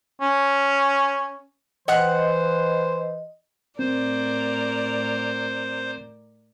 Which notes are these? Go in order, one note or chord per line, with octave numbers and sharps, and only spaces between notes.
C#4
E3 C5 D#5 F#5 F#6
A2 C4 A#4 C5 D5